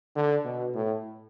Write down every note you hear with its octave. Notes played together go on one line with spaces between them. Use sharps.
D3
B2
A2